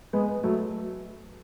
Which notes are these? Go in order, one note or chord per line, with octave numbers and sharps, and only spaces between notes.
G#3 B3
F#3 A3